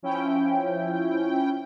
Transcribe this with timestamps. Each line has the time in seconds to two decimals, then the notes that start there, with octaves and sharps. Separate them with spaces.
0.02 F3 C#4 E4 G5